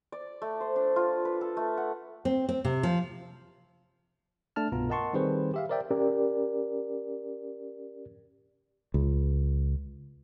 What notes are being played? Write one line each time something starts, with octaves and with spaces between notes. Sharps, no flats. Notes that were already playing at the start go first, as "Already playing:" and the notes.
D5
A3
C5
D4
F4
B4
A4
A3
F#5
C4
C4
C3
F3
A3 D4 A5 F6
C2 G2 B2 B3 F4 A#5
A#4 D#5 F#5 A5 C6 C#6
D#3 G3 C4 G#4 B4 C5
G4 E5 F5
A#4 C5 D5 E5 G5
C#4 G4 A#4 D5
C#2